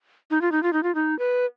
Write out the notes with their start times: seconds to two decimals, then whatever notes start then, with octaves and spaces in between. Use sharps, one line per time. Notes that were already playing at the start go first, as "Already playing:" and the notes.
0.31 D#4
0.42 F4
0.52 D#4
0.63 F4
0.73 D#4
0.83 F4
0.95 D#4
1.19 B4